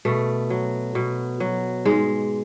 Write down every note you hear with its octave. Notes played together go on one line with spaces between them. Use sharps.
B2 A3
F#3
B2
F#3
G#2 G#3